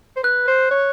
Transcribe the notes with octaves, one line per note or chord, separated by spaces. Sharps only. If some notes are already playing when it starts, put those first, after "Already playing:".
C5
B4 F#6
C5
C#5